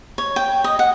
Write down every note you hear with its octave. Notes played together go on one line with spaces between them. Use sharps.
C#5
G5
D#5
F#5